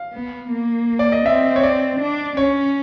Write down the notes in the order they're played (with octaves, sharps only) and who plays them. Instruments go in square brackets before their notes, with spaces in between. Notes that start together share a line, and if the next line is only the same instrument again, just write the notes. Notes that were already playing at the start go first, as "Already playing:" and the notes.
Already playing: [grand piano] F5
[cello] B3
A#3
[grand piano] D5
D#5
[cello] C4 [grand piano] E5
[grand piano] C#5
D5
[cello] D4
[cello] C#4 [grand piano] C#5